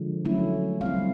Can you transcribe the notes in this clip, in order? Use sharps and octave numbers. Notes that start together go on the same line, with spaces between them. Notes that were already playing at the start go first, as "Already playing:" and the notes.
Already playing: D3 F3 G#3
F#3 A3 C#4 E4
G3 C4 E4 F5